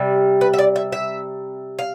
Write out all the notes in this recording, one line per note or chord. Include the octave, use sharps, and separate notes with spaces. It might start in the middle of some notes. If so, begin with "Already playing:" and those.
Already playing: C3 G3
B4
E5
D5
E5
E5
F5